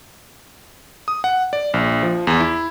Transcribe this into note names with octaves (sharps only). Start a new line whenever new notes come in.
D#6
F#5
D5
A#1
F3
E2
E4